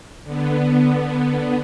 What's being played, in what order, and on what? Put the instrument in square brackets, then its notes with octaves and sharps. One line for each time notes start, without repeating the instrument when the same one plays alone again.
[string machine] D3 B3